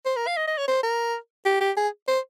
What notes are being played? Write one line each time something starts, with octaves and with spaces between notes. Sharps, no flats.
C5
A#4
F5
D#5
D#5
C#5
C5
A#4
G4
G4
G#4
C5